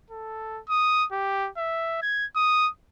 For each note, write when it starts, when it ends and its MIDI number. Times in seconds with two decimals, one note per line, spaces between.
0.10 0.61 69
0.69 1.05 87
1.12 1.50 67
1.58 2.01 76
2.02 2.26 92
2.36 2.69 87